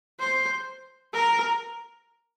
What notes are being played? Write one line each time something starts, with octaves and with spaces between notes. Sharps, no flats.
C5
A#4